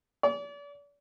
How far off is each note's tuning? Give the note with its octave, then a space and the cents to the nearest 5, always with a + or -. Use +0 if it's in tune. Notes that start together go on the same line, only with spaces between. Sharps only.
D5 -40